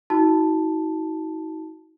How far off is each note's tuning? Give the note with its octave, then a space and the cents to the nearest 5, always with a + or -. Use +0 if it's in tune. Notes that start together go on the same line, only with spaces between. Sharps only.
D#4 +40 F#4 +0 A5 +0